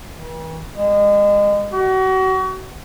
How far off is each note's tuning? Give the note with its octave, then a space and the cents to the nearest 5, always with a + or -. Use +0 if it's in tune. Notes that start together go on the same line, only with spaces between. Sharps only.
E3 -45
G#3 -30
F#4 +35